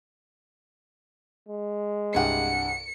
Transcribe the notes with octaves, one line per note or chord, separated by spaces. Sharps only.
G#3
C2 G2 G#4 F#5 G5 C#7